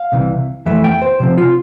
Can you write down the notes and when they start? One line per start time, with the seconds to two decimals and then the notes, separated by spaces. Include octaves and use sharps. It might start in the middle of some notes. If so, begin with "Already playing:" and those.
Already playing: F5
0.12 C2 C3 E3
0.66 F2 E3 A3 E5
0.84 G5
1.02 C5
1.20 C3 F3 C4
1.38 F4